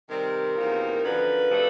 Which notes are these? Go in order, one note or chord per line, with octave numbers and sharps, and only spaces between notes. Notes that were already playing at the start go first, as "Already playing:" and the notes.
C3 D#3 G3 C4 A#4
E2 C3 F3 A#3 D#4
F#2 D3 F3 B4
C3 F3 A3 D4